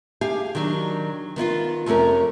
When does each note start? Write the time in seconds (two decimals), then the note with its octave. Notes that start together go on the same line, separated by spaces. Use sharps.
0.21 G4 G#4 F5
0.55 D#3 F#3 D4
1.36 D#3 B3 E4 F4
1.86 F2 C3 A3 C#4 A#4